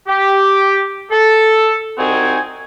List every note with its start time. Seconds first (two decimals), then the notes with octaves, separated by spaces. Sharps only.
0.08 G4
1.12 A4
1.98 C2 C4 D#4 F#4 G#5